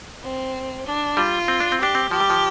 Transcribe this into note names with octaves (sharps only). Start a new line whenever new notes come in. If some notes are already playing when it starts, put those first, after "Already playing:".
C4
D4
G3 F4
C4
D4
C4
D4 G4
C4
F3 G4
G3
F3